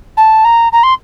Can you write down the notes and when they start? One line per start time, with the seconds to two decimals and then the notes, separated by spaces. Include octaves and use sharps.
0.17 A5
0.44 A#5
0.72 A#5
0.83 C6